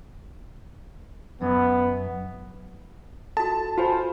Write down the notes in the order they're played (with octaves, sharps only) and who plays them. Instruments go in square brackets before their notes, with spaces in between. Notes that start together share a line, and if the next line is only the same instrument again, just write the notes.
[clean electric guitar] F#2 [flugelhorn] B3
[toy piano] F#4 A4 [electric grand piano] A5
[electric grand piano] F4 C5 [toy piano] F#4 G#5 B5